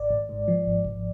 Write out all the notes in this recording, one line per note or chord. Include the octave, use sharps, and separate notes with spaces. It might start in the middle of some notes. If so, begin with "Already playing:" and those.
Already playing: G#1 D5
G#1
G#2
F3
G#1
G#1